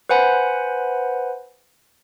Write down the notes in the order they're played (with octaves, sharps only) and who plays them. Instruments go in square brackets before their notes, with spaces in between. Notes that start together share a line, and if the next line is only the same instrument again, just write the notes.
[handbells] B4 C5 F#5 G#5 B5